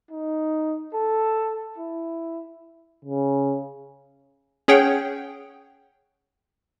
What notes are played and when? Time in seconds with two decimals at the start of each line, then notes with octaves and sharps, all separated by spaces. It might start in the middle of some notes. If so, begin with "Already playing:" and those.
0.11 D#4
0.94 A4
1.78 E4
3.05 C#3
4.68 C#4 G#4 C#5 F#5 G5